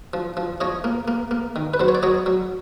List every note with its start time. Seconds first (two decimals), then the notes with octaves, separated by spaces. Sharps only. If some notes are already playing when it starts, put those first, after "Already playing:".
0.14 F3
0.37 F3
0.61 F3 C#5 D#5
0.84 A#3
1.08 A#3
1.31 A#3
1.56 D#3
1.74 B4
1.80 F#3 C5
1.88 C#5
1.95 D5
2.03 F#3 C#5 D#5
2.26 F#3